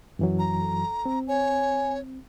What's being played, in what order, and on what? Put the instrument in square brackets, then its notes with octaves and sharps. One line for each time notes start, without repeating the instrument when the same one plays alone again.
[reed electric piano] F#2 E3 F#3
[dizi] A#5
[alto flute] A4
[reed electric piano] C4
[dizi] C#5 [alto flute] G#5